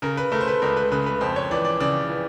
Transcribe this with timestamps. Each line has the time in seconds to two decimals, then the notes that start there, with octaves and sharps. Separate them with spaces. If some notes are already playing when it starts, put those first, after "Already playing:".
0.02 C#3 A#4
0.17 B4
0.32 A3 A#4
0.41 C5
0.48 B4
0.62 C#2 A#4
0.77 B4
0.92 C#3 B4
1.06 B4
1.21 F2 C5
1.36 C#5
1.51 E3 D5
1.65 D5
1.80 C#3 D5
2.09 E3